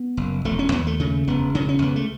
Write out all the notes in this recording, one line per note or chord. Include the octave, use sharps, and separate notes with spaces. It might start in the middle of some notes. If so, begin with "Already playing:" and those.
Already playing: B3
F#1
E1 A3
C#4
D#2 B3
A3
C#3 A3
E1 B3
C#3 C#4
C#4
C#2 B3
A3